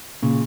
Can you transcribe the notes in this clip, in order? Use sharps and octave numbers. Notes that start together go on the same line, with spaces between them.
A#2 C#3